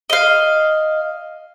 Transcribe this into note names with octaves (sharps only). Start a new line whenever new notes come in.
D#5 F5